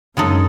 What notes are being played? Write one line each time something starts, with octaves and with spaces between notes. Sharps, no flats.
F#2 C#3 G#3 D#4 A4